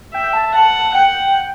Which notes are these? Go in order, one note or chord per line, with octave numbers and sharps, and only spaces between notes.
E5 G5
G5
A5
A5
F#5 A5
F#5 G5